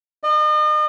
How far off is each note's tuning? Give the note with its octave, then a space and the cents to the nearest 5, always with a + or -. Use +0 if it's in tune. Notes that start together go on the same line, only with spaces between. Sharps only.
D#5 -40